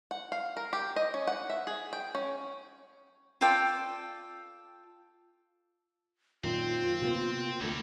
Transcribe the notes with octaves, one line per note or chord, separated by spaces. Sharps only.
F#5
F5
A#4
G4
D#5
C#4
F#5
E5
G#4
G5
C#4
F4 A4 D5 G5
F#2 A#2 D#3 C4 F4
C3 A#3 B3
D2 G3 A3 C#5